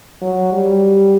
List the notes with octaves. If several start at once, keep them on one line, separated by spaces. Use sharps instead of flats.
F#3
G3